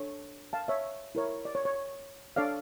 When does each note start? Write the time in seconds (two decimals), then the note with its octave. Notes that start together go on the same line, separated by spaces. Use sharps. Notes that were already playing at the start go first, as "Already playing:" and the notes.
Already playing: D4 A4 C#5
0.53 F5 A5
0.68 C#5 E5
1.15 E4 A#4 C#5
1.45 D5
1.55 C#5
1.65 C#5
2.36 D4 A4 C#5 D5 F5